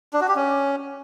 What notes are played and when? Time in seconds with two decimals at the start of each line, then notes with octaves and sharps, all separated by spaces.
0.13 D4
0.21 F#4
0.28 G4
0.35 C#4